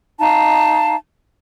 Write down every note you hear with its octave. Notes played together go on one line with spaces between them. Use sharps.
D#4 F5 A5